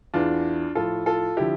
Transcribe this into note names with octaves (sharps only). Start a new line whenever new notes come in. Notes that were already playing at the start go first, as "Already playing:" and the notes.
E2 E3 D4 F4
A2 F3 F4 A4
F4 A4
D3 F3 E4 G4